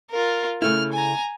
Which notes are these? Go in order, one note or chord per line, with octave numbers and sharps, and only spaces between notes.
F4 A#4
C#3 A3 E4 F6
G#5 A#5